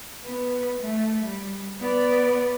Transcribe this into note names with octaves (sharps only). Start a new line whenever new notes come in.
B3
A3
G3
B3 D5